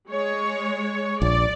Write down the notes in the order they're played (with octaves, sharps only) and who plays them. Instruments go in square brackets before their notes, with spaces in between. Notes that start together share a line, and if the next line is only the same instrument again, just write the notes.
[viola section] G#3 C#5
[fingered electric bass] A#1 [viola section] D5